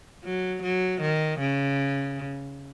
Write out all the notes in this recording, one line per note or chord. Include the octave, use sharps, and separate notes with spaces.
F#3
F#3
D#3
C#3